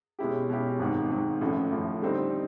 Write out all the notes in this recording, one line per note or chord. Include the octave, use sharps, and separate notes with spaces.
B2 G#3 C#4 E4 G4
B2 G#3 C#4 E4 G4
G#1 G#2 D#3
G#1 G#2 D#3
A1 A2 F3 A3
A1 A2 F3 A3
D3 G3 C4 D#4